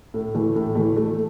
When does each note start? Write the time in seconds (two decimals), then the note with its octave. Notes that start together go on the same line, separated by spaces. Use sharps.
0.14 A2
0.35 E3 A3
0.56 A2
0.75 E3 A3
0.97 A3